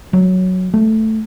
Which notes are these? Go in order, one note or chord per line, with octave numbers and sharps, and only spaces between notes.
F#3
A3